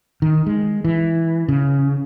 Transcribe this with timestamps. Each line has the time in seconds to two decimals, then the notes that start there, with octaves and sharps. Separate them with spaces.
0.22 D#3
0.46 G#3
0.85 E3
1.48 C#3